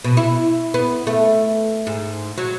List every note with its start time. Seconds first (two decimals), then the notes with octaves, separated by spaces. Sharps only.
0.04 B2
0.17 E4
0.74 B3
1.07 A3
1.87 G#2
2.38 F#3